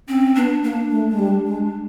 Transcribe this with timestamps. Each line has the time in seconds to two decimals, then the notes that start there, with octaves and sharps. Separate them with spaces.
0.08 C4 C#4
0.35 B3 D4
0.63 A#3 D4
0.91 A3
1.11 G#3
1.19 G3
1.47 G#3